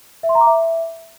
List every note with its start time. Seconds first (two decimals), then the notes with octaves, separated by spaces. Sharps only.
0.23 E5
0.29 C6
0.35 A#5
0.41 D6
0.47 E5